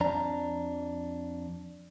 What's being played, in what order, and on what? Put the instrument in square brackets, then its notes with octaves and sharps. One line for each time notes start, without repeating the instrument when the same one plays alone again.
[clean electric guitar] F2 D4 A#5